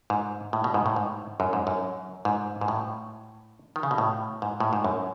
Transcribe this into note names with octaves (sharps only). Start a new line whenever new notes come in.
G#2
A2
B2
G#2
A2
G#2
F#2
G#2
F#2
G#2
G#2
A2
D#3
C#3
B2
A2
G#2
A2
G#2
F#2